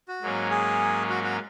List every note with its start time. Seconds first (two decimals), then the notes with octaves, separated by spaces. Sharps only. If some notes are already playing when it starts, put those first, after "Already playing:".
0.08 F#4
0.22 G#2 F#3 A#3 C#4
0.51 G#4
1.10 F#4
1.24 F#4